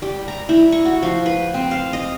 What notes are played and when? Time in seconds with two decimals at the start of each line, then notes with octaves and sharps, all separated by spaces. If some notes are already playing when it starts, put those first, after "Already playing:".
0.02 G3
0.28 A#5
0.49 E4
0.72 C#6
0.85 F#4
1.03 F3
1.26 B4
1.54 C4
1.71 F5
1.93 D#5